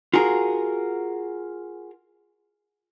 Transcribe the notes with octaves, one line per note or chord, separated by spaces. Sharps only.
F4 F#4 G#4 A#4